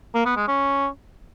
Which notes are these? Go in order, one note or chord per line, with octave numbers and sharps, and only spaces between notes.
A#3
B3
G#3
C#4